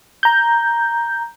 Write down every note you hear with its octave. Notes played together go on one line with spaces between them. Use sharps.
A#5 G6